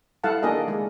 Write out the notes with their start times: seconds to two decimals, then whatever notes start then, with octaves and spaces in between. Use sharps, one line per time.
0.24 G3 E4 A4 F5 F#5 A5
0.43 A#3 D4 G4 G#4 A#4 D#5
0.68 G#3